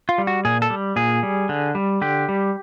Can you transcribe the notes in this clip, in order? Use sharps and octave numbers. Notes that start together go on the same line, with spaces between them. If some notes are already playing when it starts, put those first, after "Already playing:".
F4
G3
F#4
A#2 G#4
A4
G3
A#2 G#4
G3
D3
G3
D3 G4
G3